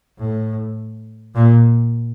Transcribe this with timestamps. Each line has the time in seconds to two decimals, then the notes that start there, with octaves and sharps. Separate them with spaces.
0.19 A2
1.35 A#2